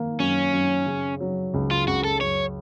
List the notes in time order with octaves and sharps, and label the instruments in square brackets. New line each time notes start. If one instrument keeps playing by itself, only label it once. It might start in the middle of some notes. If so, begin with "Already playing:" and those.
Already playing: [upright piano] D#3 A#3
[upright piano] F#2 [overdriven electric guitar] C#4
[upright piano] F#2
C#3
F#3
C#2
[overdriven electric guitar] F4
[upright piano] C#2 [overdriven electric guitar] F#4
[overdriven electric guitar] A4
[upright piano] F#2 [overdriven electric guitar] C#5